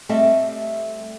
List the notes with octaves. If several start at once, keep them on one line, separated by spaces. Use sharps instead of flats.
G3 A3 C4 A4 D#5 E5